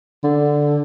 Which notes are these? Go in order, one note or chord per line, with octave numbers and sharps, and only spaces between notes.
D3